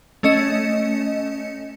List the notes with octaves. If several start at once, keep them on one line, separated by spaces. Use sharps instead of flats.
A3 C#4 D#5 C#7 E7